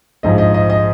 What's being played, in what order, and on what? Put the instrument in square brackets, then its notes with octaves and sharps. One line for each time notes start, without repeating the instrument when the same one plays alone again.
[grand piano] A#1 G#2 F3 D#5
D#5
D#5
D#5